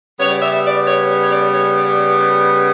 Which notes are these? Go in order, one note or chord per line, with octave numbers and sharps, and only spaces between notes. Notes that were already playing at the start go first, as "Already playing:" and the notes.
C#3 G3 B3 C#5
D5
E5
D5
C#5
C#5
D5
C#5
D5